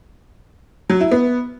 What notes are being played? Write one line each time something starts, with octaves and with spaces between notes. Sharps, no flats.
F#3
E4
B3